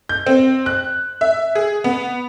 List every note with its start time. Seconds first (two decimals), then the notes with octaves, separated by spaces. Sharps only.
0.09 G6
0.26 C4
0.66 F#6
1.21 E5
1.55 G#4
1.84 B3